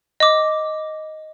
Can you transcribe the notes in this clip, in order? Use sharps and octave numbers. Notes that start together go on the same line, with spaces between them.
D#5 D6